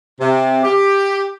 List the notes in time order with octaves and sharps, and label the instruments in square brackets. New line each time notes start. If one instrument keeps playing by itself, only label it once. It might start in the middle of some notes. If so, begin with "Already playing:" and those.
[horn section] C3
G4